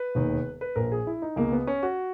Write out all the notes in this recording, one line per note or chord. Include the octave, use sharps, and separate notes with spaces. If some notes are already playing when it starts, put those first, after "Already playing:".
Already playing: B4
E1 D#2 D#3
B4
A#1 A#2 A#4
G#4
E4
D#4
C#2 B2 A#3
B3
C#4
F#4